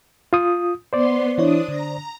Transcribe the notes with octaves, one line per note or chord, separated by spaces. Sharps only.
F4 D#6
B3 C5 D5 C6
E3 D4 E4 C#5 D#6
D3 A#5